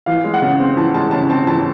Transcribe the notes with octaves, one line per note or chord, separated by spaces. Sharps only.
E3 F5
G#3
F#5
C#3
C4
E3 A5
G#3 A5
C#3 A5
C4 A5
E3 A5